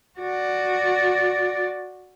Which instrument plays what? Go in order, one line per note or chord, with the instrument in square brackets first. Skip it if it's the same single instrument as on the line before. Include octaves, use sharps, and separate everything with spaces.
[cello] F#4 D5